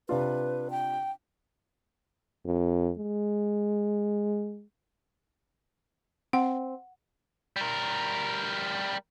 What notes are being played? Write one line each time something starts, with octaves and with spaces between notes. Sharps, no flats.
C3 D4 F4 B4
G5
F2
G#3
C4 F#5
G3 A#4